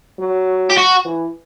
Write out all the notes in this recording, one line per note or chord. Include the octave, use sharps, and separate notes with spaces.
F#3
G4
F#4
E3